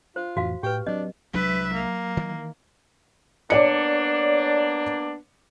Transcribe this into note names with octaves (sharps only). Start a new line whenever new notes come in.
F4 C5
F2 A2 E3 F#4 F5
A2 G4 B4 G5
F#3 C4 D4 D#5
C2 F#3 G#3 D4 B4 E5
A#3
D#3 E3
A#3 B3 D4 C#5 D5 C#7